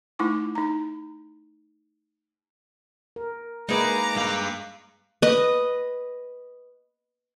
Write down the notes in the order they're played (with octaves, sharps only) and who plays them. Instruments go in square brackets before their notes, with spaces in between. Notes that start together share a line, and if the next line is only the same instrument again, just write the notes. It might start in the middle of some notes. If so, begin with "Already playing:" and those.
[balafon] A3 D#4 E4 C#6 D6
D#4 A#5
[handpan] A#4
[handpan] G#3 A#3 B4 [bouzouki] D#4 E4 G#4 [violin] A#5 D6
[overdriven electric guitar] G2 F5
[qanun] B4 D#5